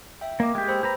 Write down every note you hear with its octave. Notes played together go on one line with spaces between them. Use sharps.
E5 G5
A#3 A#4 D#5 D6
G#3 G4 G5
C5 B5 E6
G4 B4 A#5